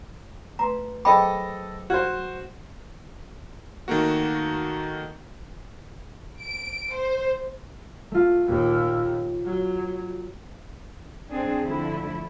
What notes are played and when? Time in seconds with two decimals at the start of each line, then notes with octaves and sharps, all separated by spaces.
0.59 A3 B4 A#5 C6
1.05 F#3 G#4 A4 C5 D#5 G5 B5 D6
1.90 F#4 C5 F6 G#6
3.88 D#3 A3 A#3 F#4
6.40 D7
6.93 C5
8.11 A3 F4
8.46 D#2 A#2
9.45 F#3
11.30 C4 D4 G#4
11.62 D3 F3 A3 E4